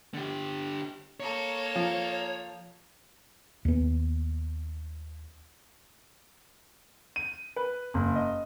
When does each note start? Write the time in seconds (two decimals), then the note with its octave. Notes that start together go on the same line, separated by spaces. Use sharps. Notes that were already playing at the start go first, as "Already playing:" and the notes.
0.14 D3 G4
1.20 A#3 A4 C#5
1.76 F3
3.65 D#2 B3
7.16 D#7
7.56 B4
7.94 F#1
8.16 D#5